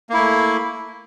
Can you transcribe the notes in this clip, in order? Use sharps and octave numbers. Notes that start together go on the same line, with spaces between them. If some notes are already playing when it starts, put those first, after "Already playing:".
A3 A#3 E4